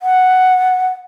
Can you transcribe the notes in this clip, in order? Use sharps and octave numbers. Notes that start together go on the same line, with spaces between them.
F#5